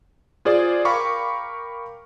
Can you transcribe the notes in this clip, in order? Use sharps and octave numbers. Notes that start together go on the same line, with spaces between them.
F4 G#4 C5 D5
A#4 F5 G5 B5 C#6 D6